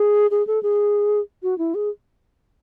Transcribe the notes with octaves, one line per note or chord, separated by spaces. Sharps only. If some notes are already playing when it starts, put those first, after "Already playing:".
Already playing: G#4
G#4
A4
G#4
F#4
E4
G#4